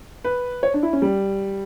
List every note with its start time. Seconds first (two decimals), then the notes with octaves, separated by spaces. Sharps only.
0.24 B4
0.63 C#5
0.74 D4
0.83 E4
0.93 C#4
1.02 G3